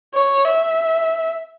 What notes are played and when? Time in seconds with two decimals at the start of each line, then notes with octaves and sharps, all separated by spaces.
0.14 C#5
0.45 E5